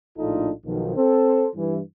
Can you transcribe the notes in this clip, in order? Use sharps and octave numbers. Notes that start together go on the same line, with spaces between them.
A#1 A2 D4 D#4 F4 A4
B1 B2 D#3 F3
C4 A4 C5
G2 E3